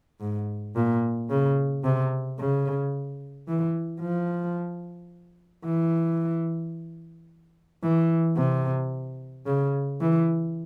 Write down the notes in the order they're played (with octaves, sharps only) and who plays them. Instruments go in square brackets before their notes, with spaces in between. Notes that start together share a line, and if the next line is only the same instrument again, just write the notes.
[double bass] G#2
A#2
C#3
C3
C#3
E3
F3
E3
E3
C3
C#3
E3